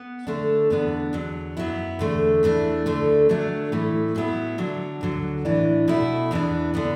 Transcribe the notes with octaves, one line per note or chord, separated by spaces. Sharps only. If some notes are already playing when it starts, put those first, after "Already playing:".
Already playing: B3
D3 A3 D4
E2 D3 B3 D4
E2 D3 F#3
F#2 F#3 B3 E4
E2 D3 A3
E2 E3 A3 D4
D2 D3 A3
D3 F#3 A3 D4
A2 E3 A3
A2 F#3 B3 E4
D3 F#3 D4
D2 D3 F#3
A2 E3 D4
B2 A3 E4
E2 E3 B3 D4
D3 B3 D4